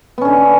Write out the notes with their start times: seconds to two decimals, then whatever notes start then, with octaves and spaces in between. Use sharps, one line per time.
0.18 B3
0.21 C#4
0.25 D3